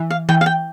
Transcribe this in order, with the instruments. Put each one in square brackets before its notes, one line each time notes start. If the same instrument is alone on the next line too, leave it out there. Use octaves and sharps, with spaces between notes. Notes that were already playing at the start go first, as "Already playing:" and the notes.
Already playing: [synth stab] E3
[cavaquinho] F5
[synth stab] E3 [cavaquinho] G5
[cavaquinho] F5
G5